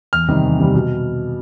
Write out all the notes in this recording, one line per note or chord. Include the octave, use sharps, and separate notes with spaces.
E2 F6
C3 D#3 G3
E2
C3 D#3 G3
B2